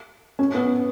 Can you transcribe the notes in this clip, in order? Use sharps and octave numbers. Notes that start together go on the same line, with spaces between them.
C#4
B3